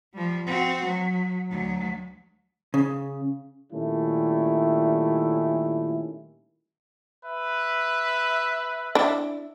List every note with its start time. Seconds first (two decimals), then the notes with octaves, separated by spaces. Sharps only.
0.14 F3 G3
0.47 C4 F#4
0.87 F#3
1.51 D2 F#3
2.74 C#3
3.73 A#2 D#3 G3 A3 C#4 E4
7.23 B4 E5
8.95 D4 E4